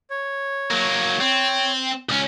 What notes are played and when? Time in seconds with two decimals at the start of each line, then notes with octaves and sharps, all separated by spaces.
0.10 C#5
0.71 F#3 A#3
1.21 C4
2.09 C#2 C#4